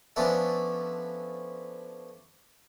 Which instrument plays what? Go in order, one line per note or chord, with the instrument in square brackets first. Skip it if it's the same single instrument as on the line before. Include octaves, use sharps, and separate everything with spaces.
[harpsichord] F3 B3 C#4 D4 E4 A4